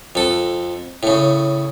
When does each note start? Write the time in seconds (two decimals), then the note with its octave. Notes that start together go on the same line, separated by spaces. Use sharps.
0.15 F2 A4
1.03 A2 C#3